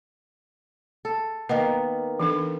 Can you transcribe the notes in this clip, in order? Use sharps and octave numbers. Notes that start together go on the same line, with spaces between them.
A4
D#3 A#3 B3 D#5
E3 D4 A4